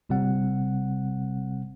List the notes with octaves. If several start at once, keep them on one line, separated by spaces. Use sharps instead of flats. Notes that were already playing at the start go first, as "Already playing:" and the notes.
G1 C3 G3 C4 F#5